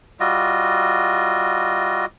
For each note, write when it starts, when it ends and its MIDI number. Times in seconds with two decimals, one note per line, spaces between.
0.20 2.05 55
0.20 2.05 65
0.20 2.05 66
0.20 2.05 75